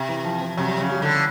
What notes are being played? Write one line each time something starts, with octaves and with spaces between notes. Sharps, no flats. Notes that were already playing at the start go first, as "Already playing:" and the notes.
Already playing: C3
E3
F3
F3
C3 F#3
G3
C#3 F#3
G3
D3